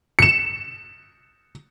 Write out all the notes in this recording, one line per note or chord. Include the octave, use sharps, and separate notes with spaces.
C#7 E7